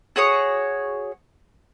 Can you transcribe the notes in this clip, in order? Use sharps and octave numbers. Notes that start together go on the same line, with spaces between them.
F#4 G#4 C#5 D#6